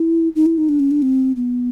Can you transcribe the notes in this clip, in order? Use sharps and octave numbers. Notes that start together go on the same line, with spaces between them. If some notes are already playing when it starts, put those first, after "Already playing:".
Already playing: E4
D#4
E4
D#4
D4
C#4
D4
C4
B3